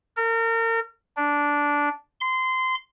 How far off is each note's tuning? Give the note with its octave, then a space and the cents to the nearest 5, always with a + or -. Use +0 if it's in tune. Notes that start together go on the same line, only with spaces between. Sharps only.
A#4 -35
D4 -10
C6 -20